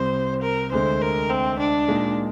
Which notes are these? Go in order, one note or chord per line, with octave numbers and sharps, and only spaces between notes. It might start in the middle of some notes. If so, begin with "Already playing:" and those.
Already playing: C2 C3 G3 C4 C5
A#4
D2 D3 G#3 C5
A#4
C4
D4
A#2 G#3 D#4